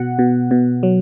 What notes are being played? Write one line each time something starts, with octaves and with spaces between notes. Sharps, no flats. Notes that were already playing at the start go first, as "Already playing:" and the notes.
Already playing: B2 F#5
B2
B2
F#3